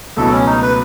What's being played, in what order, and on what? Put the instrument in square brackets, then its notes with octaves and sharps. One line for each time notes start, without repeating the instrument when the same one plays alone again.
[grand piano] C#2 B2 F#3 A3 E4 [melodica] A4
[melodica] C#4
D#4
B4